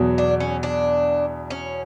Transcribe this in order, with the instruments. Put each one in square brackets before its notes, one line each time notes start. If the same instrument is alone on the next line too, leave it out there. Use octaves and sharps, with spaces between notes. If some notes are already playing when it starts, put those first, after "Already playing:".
Already playing: [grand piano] E2 B2 F#3
[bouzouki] D4
C#4
D4
C#4